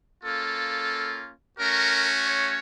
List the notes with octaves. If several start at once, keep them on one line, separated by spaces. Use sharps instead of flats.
A#3 C#4 F4 A4
A3 C#4 F#4 A#4
C#5